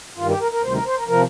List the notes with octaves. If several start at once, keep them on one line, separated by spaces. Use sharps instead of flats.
G2 D#3 G3 F4
G4
A#4
A#4
D2 C3 D#3 G3 C5
A#4
C5
A#4
C3 F3 A#4